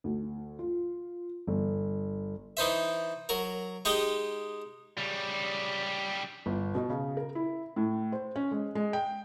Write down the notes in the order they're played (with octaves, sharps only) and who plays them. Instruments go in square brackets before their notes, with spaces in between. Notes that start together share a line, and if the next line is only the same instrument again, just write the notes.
[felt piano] D2
F4
G1
[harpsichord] E3 D#4 C5 E5
F#3 A#4
G#3 D#4 G4 D#5
[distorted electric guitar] C#3 G3
[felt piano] G1
B2
C#3
A#4
E4
A2
C5
C#4
G#3
G#3
G5